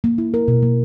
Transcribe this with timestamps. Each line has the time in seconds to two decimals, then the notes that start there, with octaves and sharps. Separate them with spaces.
0.04 A#3
0.18 E4
0.34 A#4
0.48 B2
0.63 A#3